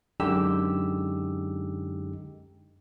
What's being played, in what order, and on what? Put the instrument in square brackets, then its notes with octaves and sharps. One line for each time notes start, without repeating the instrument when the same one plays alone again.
[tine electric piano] F#2 D3 G#3 D#4 G4 E6